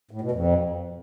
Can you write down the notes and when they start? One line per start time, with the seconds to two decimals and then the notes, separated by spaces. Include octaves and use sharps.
0.11 A2
0.21 B2
0.31 F2